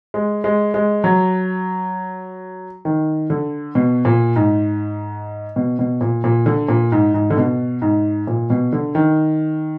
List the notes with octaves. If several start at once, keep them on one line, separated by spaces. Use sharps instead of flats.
G#3
G#3
G#3
F#3
D#3
D3
B2
A#2
G#2
B2
B2
A#2
A#2
D3
A#2
G#2
G#2
D3
B2
G#2
A#2
B2
D3
D#3